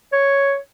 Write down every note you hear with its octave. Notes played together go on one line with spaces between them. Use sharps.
C#5